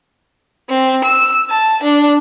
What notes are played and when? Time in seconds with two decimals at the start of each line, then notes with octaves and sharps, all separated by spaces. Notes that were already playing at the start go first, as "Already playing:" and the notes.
0.69 C4
1.04 E6
1.50 A5
1.83 D4